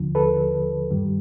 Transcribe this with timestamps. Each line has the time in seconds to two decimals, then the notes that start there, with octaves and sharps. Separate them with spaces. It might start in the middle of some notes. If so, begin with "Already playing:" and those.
Already playing: D#2 D3 F3
0.15 A4 B4
0.91 G2 D#3 G3